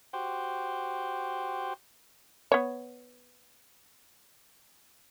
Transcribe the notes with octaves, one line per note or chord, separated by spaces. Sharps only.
F#4 G4 C5 G5
B3 C#5